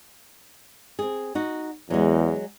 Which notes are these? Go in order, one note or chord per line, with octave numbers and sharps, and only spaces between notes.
C4 G#4
D#4 F#4
E2 F#3 G#3